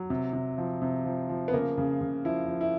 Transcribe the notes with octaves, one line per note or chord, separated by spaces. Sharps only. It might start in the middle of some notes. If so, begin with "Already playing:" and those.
Already playing: F#3
C3
C3
F3
C3
F3
F3
B3
C#3 A#3
C#3
C#3
F3 E4
F3
E4